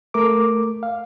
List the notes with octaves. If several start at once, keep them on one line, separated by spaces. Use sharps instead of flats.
A3 A#4 D6
F5